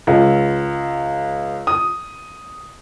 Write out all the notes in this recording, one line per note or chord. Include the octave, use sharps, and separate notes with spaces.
C#2
D#6